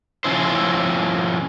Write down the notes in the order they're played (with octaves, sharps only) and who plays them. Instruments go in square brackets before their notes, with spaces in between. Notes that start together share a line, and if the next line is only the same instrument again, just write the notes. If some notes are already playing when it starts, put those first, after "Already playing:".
[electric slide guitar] F3 C#4 E4 C5